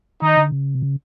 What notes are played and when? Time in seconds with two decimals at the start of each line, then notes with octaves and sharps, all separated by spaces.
0.21 D#3 D#4
0.37 D3
0.52 C#3
0.75 C3
0.82 C#3